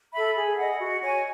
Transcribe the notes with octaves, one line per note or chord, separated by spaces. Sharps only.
A4 E5 B5
G#4
D#5 F#5
F#4
C#5 G#5